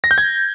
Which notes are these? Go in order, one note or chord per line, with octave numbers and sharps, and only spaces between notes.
A#6
G6
G#6